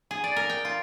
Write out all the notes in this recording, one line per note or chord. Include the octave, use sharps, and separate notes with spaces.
G#4
D5
A#4
G5
F4